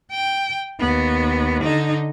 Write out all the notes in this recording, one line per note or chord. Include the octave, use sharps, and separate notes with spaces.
G5
D#2 B3
D3 D#4